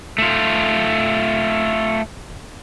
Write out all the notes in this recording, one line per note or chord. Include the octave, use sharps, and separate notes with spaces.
A3 F4